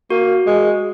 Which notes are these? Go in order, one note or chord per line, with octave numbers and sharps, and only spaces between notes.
A#3 F#4
G#3